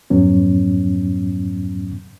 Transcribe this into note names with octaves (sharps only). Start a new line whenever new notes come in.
F2 G#2 F#3 B3 C#4